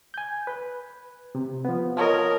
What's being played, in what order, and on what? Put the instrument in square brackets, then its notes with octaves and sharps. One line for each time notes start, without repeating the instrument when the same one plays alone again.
[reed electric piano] G#5 G6
B4
C3
F3 B3
[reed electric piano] F4 C#5 D#5 [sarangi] A#4